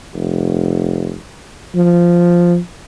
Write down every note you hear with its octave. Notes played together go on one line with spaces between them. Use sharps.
F1
F3